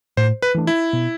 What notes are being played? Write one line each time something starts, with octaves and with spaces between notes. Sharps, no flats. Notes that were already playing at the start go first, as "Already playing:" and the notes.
A2 C5
B4
E3 A3 D4
E4
B2